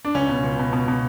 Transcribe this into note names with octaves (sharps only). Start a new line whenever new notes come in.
D4
C#2 C#4
B2
C#2
B2
B2
B2